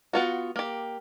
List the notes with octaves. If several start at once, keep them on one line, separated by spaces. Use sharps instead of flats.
B3 F4 F#4
A#3 G4